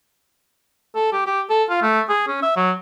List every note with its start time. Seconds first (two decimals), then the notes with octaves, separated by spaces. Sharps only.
0.95 A4
1.12 G4
1.26 G4
1.50 A4
1.70 F4
1.83 A3
2.09 G#4
2.28 C#4
2.42 E5
2.56 F#3